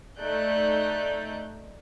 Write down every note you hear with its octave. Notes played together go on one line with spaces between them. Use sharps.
A3 D#4 D5 F#6 G6